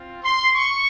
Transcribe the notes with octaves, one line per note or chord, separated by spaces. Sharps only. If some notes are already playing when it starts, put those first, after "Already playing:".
Already playing: C4 F4
C6
C#6